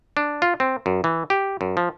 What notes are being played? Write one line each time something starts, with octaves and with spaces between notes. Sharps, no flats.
D4
F4
C4
F#2
E3
G4
F#2
F3